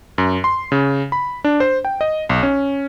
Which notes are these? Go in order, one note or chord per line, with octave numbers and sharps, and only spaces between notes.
F#2
C6
C#3
B5
D4
C5
G5
D#5
B1
C#4